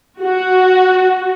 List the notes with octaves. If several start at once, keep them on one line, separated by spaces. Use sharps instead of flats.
F#4